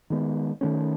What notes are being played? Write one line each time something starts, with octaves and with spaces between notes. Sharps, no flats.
D#3 G#3 B3
D#3 F#3 A3 C#4